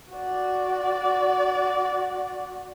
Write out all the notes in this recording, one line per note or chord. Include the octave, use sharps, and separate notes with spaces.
F#4 D5